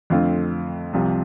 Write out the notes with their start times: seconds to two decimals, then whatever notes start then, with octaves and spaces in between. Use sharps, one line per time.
0.10 F2 D3 A3 C4 F4
0.93 C2 C3 F3